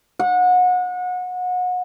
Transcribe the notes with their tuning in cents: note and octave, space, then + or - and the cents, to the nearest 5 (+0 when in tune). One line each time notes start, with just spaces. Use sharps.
F#5 -30